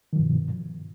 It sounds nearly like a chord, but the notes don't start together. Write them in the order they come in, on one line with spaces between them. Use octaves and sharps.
D#3 F3 G2 B2